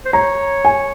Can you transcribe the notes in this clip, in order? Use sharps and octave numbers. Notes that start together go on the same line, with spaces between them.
C5
C#5 A#5
G#5